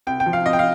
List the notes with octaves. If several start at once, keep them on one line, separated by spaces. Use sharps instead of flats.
C2 G5
G5
F3
F5
C2 D#5
G5
F5